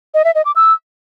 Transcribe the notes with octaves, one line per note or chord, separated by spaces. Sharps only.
D#5
E5
D#5
D6
E6